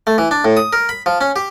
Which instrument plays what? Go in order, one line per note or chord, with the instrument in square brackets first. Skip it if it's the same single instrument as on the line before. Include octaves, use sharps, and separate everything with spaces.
[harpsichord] A3
E3
D4
A2
D#6
A#4
B5
F3
C#4
G4